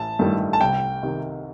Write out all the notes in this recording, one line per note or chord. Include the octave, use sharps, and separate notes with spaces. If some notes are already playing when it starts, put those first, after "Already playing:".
Already playing: A1 A5
G2 D#3 A3 E4
A5
C2 G5
C3 D#3